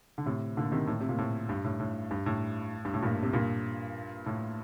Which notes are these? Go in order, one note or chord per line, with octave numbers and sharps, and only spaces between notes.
D3
A2 C3
A#2 D3
C3 D#3
A2
C3
A#2
A2
G2
A2
A2
G2
A2
G2
A2
G2 A#2
C3
G2 A#2
A2